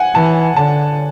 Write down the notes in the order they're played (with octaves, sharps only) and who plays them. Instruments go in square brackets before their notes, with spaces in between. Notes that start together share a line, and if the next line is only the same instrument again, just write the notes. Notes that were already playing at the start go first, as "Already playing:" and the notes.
Already playing: [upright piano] F#5 G#5
[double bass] E3 [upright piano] A5
[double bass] D3 [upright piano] A5